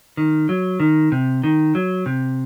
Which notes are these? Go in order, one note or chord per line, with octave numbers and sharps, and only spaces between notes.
D#3
F#3
D#3
C3
D#3
F#3
C3